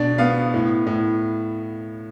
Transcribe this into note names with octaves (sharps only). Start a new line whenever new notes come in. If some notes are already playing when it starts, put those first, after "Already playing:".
Already playing: B2 D4 D5
B3 F5
A2
A2